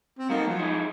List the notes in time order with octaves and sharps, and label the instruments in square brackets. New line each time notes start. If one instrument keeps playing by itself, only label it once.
[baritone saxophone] C4
[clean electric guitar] F#3 D#4 [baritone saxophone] A#3
[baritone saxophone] F3 [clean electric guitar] F#3
[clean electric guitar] D#4 E4 G#4